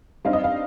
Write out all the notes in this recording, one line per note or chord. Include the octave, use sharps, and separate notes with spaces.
G2 G3 C4 D#4 F5
D#5
F5